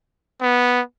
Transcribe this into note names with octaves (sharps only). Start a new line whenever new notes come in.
B3